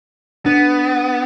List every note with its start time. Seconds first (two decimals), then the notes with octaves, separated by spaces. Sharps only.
0.46 B3 D4